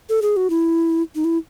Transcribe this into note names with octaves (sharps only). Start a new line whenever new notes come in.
A4
G#4
F#4
E4
D#4
E4